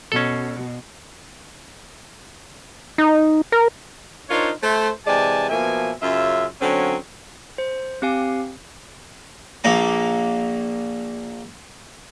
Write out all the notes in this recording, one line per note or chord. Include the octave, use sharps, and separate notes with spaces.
B2 C#4 A4
D#4
A#4
D4 D#4 F4 A#4 C5 C#5
A3 C5
C3 E3 G#3 D5 G#5 A5
B2 F3 A#3 E5 G#5
F#2 C#3 F4 E5
D3 F#3 C4 C#4
C5
C4 G4 F5 G#5
A#1 A#2 A#3 A#5